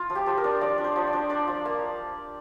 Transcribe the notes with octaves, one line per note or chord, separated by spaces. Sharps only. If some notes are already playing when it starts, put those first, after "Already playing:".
Already playing: F4
F3
G4
F3 C5
A#4
D4
F3 D5
D4
C5
F3
D5
D4
D4 D5
F3
A#3